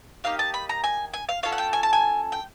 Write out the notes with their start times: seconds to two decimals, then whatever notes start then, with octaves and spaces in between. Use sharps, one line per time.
0.24 A#3 D#4 G4 F5
0.39 A5
0.54 B5
0.69 A#5
0.84 G#5
1.14 G#5
1.29 F5
1.43 C#4 F4 A4 F5
1.52 F#5
1.58 G5
1.73 G#5
1.83 A5
1.93 G#5
2.32 G5